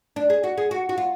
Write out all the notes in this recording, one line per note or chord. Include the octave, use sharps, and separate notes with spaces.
D4
G#4
F#4
G#4
F#4
F#4
F4